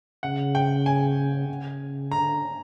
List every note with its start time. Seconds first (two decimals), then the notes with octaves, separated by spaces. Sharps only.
0.23 C#3 F#5
0.55 G5
0.86 G#5
1.49 C#3
2.12 D3 A#5